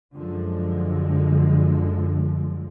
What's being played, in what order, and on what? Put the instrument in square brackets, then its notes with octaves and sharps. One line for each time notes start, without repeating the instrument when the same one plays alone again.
[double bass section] F#2 D3 F3 G#3